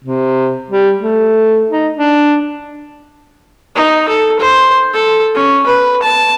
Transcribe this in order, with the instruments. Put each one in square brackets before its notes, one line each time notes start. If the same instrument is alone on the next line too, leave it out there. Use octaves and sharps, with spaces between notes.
[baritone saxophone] C3
G3
A3
D#4
D4
[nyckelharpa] D#4
A4
C5
A4
C#4
B4
A5